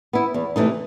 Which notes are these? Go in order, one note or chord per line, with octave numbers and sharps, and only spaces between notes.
B3 E4
E2
C3 E3 A3 D#4